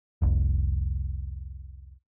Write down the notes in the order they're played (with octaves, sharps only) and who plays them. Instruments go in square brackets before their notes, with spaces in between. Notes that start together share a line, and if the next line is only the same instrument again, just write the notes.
[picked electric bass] F1 C2